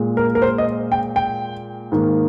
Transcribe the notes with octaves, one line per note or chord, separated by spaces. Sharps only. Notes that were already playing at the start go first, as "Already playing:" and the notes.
Already playing: A#2 G#3
A#4
A#4
C5
D#5
G5
G5
G#2 D#3 A#3